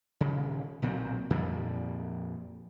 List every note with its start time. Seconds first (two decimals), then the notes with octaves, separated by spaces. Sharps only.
0.21 D#1 C#3
0.82 B1 A#2 F#3 C4
1.30 F2 A#2 F3 G3